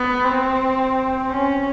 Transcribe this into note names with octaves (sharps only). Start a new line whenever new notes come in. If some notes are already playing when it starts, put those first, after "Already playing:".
Already playing: B3
C4
C#4